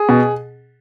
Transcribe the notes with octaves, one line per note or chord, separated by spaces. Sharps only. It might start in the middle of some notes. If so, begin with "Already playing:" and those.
Already playing: G#4
B2